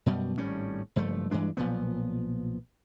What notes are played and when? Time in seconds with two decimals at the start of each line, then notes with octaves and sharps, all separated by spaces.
0.06 F#2 B2 G3
0.38 G#1 A2 G3 C#4
0.96 F#1 G2 F3 A3
1.31 G2 E3 G#3 D4
1.57 B1 A#2 F3 B3